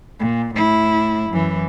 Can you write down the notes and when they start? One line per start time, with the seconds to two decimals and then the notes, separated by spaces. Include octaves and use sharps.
0.20 A#2
0.55 A2 E4
1.30 F#2 E3